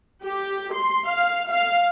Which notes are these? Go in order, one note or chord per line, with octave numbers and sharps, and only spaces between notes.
G4
C6
F5
F5